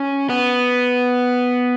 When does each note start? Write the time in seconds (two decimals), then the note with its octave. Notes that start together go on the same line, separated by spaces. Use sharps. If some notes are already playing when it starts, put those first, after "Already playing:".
Already playing: C#4
0.30 B3